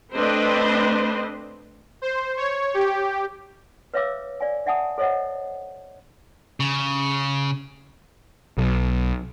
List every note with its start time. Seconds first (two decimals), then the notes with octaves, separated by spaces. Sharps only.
0.14 A3 C4 D4 B4 C5 D#5
2.02 C5
2.37 C#5
2.74 G4
3.94 B4 C#5 E5 F5 D6 E6
4.40 D5 F5 G#5
4.66 D5 E5 F#5 G#5 A5 D#6
4.98 A4 C5 C#5 D#5 E5 F#5
6.60 C#3
8.58 B1